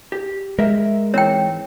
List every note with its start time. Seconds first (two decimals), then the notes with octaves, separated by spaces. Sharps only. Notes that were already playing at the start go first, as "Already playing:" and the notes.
0.12 G4
0.59 G#3 A#4 E5
1.14 G#2 E3 C4 C#5 G5